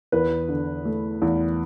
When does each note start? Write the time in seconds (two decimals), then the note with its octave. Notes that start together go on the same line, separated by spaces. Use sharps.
0.12 E2 B4
0.49 D3
0.85 A3
1.22 E2